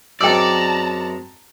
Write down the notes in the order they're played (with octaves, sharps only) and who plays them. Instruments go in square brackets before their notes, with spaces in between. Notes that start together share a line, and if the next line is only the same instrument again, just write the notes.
[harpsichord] F#2 G#3 C4 [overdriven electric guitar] D5 [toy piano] G5 E6 [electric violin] A5 A#5